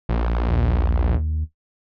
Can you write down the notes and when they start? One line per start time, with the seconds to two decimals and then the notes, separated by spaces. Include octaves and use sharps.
0.09 A#1
0.48 D#2